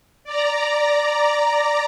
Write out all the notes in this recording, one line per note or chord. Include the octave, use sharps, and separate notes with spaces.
D5 A#5